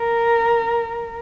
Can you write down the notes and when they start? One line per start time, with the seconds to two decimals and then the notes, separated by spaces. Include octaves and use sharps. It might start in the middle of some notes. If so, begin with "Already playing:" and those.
Already playing: A#4